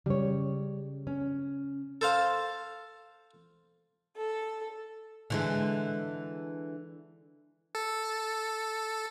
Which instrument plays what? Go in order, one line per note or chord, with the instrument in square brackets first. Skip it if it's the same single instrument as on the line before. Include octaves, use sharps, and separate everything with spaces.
[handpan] C#3 [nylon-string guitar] G3 C#5
[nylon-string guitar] C#4
[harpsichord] A4 C5 F5
[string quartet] A4
[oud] D3 E3 G#3
[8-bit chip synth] A4